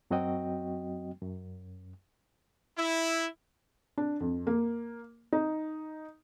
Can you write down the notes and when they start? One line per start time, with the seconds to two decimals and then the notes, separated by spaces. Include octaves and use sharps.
0.11 F#2 F#3 C4 F#4 D#5 G5
1.22 F#2
2.78 E4
3.98 D4
4.20 F2
4.47 A#3
5.32 D#4